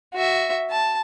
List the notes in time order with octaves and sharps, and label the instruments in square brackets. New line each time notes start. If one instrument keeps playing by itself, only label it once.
[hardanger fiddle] F#4 E5
A5